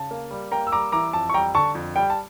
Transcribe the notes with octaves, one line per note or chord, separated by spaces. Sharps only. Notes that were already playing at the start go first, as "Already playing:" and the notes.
Already playing: C#3 A5
A#3
G3
A#3 G5 A#5
E6
G3 A#5 D6
E3 A#5 D6
F2 A5
C#6
G3 G5 A#5
D3 A5 C#6
F2
G3 G5
A5